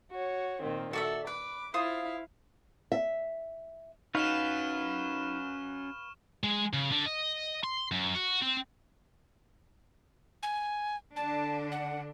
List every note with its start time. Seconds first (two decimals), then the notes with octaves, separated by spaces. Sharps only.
0.12 F#4 C#5
0.61 A#2 D#3 C4
0.93 F#4 A4 D5 E5
1.27 B4 D6
1.74 E4 F4 C5 F5 D#6
2.92 E5
4.15 C#4 D#4 F#4 B4 F5 C#6 F6 E7
6.44 G#3
6.73 C#3
6.91 D3
7.06 D#5
7.64 C6
7.92 F#2
8.15 F#4
8.42 C4
10.43 G#5
11.16 D3 D4 A5
11.72 F#5